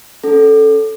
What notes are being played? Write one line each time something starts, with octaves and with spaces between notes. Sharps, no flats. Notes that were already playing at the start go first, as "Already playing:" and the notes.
C#4 A4